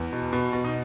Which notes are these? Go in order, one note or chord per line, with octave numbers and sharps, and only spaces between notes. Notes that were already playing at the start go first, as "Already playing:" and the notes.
Already playing: E2
B2
B2
B2
D#4